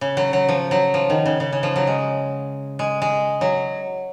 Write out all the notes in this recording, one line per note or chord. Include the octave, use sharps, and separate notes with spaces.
C#3
F#3
F#3
F3
F#3
F3
D#3
C#3
C#3
C#3
F3
F#3
G#3
G#3
G#3
F#3